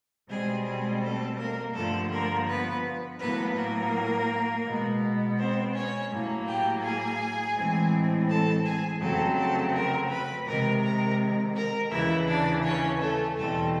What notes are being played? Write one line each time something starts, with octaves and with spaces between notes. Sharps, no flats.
B2 G3 G#3 C4 G#4
G#3 G#4
A3 A4
A#3 A#4
G2 D3 F3 A3 A4
A#3 A#4
B3 B4
A2 F#3 A#3 B3 B4
A#3 A#4
B2 G#3 B3
C4 C5
C#4 C#5
A2 F#3 A#3
G4 G5
G#4 G#5
A2 E3 G#3 C4
A4 A5
G#4 G#5
F2 C#3 F#3 A3 C4 A4 A5
A4 A5
A#4 A#5
B4 B5
C3 D#3 G#3 A#4 A#5
A#4 A#5
A#4 A#5
D#2 C#3 E3 E4 E5
D4 D5
C#4 C#5
A3 A4
E2 B2 G3 A3 C4 A4